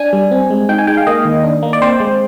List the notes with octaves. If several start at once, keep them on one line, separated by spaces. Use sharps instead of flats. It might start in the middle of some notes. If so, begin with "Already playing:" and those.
Already playing: D4 G#5
G3
C4
G#3
D#4 G5
G#5
G#3 G5
F5
A#3 D#5
D#3
D4
A#3
D5
C4 C5
G#3